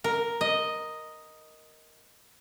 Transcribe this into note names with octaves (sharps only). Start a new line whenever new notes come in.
A#4
D#5